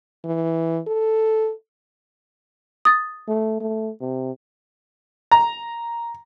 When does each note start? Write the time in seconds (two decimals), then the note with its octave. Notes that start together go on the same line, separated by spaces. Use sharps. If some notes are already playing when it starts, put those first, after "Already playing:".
0.25 E3
0.88 A4
2.85 D#6 A6
3.28 A3
3.60 A3
4.01 C3
5.32 A#5